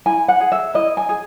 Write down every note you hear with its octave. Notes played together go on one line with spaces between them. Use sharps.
E4 G#5
F#5
G#4
E5
E4 D#5
G#5
G#4